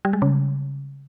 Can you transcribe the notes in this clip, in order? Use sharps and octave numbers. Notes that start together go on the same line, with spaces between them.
G3
G#3
C#3